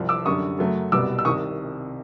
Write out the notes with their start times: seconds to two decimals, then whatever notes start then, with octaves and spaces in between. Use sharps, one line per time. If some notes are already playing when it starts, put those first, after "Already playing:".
Already playing: C2 C3 F3
0.09 D6 E6
0.25 F#2 D3 G3 C#6 D#6
0.58 F#2 C#3 F#3 A3
0.92 C2 B2 G3 B3 D6 E6
1.19 E6
1.25 C2 C3 D#3 C#6 D#6